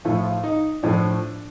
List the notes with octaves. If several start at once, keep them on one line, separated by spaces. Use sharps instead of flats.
A2 F3 A3 F4
F4
D#4
A2 F3 A3 D4